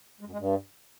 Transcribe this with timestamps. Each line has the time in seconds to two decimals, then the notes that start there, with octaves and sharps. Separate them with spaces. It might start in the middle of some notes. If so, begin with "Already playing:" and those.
0.21 G#3
0.27 F#2
0.33 G#3
0.39 G2